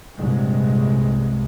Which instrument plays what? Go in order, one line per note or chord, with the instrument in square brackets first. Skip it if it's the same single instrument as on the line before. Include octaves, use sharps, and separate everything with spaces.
[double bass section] C2 G2 A#2 G#3